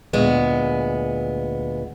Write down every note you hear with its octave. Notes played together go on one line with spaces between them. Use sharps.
D2 A#2 G#3 B3